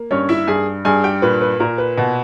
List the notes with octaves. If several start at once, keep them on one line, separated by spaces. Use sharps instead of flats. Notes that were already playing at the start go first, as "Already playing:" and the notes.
Already playing: A#3
G2 C#4 C#5
E4 E5
G2 G#4 G#5
G2 G#4 G#5
G4 G5
A#2 B4
B4
A#2 A#4
B4
B2